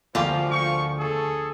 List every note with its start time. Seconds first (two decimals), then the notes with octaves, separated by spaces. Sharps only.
0.15 D2 F3 A#3 F4 G4
0.51 C#6
0.99 G#4 A4